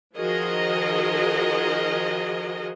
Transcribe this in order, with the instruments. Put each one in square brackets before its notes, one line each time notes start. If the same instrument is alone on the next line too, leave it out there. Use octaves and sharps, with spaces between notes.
[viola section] D#3 F3 F#4 G#4 A#4 D#5